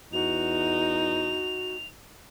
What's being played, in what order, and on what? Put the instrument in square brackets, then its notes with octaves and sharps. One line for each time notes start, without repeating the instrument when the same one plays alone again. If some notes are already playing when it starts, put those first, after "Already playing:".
[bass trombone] E2 [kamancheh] D#4 [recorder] F#4 [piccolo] F7